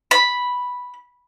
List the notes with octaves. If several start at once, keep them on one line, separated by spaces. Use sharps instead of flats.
B5